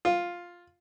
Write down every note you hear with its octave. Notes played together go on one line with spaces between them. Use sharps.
F4